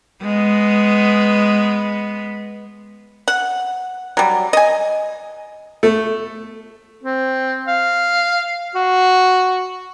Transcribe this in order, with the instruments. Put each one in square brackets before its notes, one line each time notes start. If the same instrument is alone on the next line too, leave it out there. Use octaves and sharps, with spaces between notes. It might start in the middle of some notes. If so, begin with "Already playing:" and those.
[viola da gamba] G#3 B3
[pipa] F#5
F#3 G3
D#5 G#5
[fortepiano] A3
[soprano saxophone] C4
F5
F#4